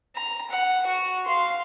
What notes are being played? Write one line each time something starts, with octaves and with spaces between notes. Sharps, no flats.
A#5
F#5
F#4
F5 C6